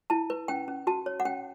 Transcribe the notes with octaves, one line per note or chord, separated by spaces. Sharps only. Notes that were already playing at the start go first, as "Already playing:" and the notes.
E4 A5
B4
C#4 G5
C#4
F#4 A5
C#5
F#5
C#4 G5